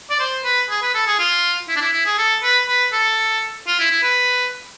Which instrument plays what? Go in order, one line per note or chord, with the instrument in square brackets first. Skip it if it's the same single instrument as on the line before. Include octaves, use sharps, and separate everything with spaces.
[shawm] D5
C5
B4
G#4
B4
A4
G#4
F4
E4
D4
E4
E4
G#4
A4
B4
B4
A4
F4
E4
E4
B4